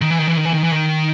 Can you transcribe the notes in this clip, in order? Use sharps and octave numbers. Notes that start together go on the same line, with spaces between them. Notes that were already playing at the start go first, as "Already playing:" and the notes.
D#3
E3
D#3
E3
D#3
E3
D#3
E3
D#3